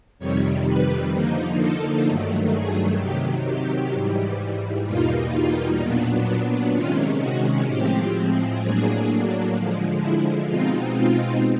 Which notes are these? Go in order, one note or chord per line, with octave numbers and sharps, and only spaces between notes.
F2 C3 D#3 G3 C#5
B4
D3 F3 A#3 D#4
A4
G2 D#3 F#3 A3
G#4
C3 D#3 F#3 G4
G4
G#2 E3 G3
E2 B2 G3 A#3 D#4 F4
F4
A#2 F#3 B3 D4
C3 D#3 G#3 C#4 F4
F#4
A2 F3 G#3 C4 G4
A2 F#3 A#3 D4 G#4
D3 F3 G#3
E4
B2 G#3 C4 D#4 F4
F4